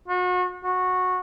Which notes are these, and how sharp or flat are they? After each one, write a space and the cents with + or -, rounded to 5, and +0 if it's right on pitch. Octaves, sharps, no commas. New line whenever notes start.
F#4 -35
F#4 -15